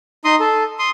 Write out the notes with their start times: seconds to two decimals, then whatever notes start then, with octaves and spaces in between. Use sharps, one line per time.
0.25 D#4 D#5 C6 D#6
0.40 A4
0.79 C6 D#6